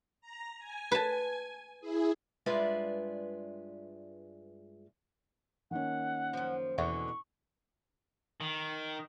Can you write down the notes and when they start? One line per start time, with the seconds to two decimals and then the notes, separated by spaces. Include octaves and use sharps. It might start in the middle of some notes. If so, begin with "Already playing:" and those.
0.21 A#5
0.59 G#5
0.92 B4 A5
1.80 E4 G#4
2.46 G2 G#3 F4 B4 D5 E5
5.71 D#3 A#3 C#4 F#5
6.33 F#2 F3
6.78 E2 B2 D3 E3 C#6
8.41 D#3